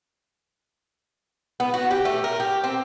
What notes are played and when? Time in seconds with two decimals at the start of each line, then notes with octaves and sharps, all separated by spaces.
1.60 B3
1.74 F#4
1.91 G4
2.05 A3
2.24 A#4
2.40 G4
2.64 C4